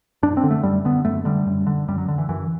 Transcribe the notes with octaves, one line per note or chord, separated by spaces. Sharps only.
F#2 D4
C4
D3
A3
F#2 G3
D3 B3
F#2 A3
D3 G3
F#2
D3
F#2 G3
F#3
D3
E3
F#2 E3